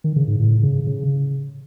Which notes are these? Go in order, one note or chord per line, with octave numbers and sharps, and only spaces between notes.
D#3
C#3
G#2
A2
C#3
C#3